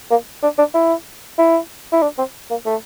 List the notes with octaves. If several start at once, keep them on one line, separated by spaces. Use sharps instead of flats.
A#3
D4
D4
E4
E4
E4
D4
C4
A#3
A3